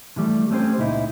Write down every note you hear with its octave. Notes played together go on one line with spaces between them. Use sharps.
D3 E3 G3 A3
A3 C4 C#4 G4 C5
C#2 A#2 D#4 E4